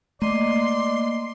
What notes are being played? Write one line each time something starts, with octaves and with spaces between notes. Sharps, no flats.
A3 A#3 D5 D#5 C6